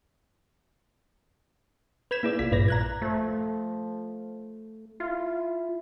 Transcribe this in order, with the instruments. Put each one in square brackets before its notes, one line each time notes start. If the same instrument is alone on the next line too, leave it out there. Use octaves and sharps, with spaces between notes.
[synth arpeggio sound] B4 G6 G#6 B6 E7
A#3 E4 G#4 D5
B1 F4 B6
A#1 G2 A#2 B4 D5 A#6
A#5 F#6 G#6
[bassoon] F3 [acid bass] A3
[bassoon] E4 [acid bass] F4